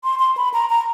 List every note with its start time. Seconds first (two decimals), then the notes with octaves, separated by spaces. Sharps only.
0.04 C6
0.19 C6
0.37 B5
0.54 A#5
0.70 A#5